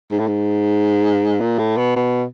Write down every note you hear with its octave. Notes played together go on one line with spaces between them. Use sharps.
G#2
A2
G#2
A#2
A2
B2
B2